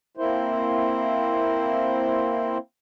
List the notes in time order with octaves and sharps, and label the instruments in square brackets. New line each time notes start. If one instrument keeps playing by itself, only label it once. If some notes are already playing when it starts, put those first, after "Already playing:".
[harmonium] A#3 C4 E4 C5